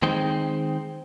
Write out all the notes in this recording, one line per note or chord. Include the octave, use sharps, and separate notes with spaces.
D#3 G#3 C4 D#4 G5